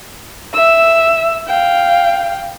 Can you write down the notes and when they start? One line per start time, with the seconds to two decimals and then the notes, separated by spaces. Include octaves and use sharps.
0.54 E5 E6
1.48 F5 G5